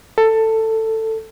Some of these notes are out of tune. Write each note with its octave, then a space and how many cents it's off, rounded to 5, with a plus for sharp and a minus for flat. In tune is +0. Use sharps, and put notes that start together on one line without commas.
A4 +15